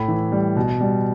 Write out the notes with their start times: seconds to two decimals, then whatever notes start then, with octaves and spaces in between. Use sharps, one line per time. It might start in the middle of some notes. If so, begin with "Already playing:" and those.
Already playing: A2 B5
0.08 E3
0.32 G3
0.56 B2
0.81 G3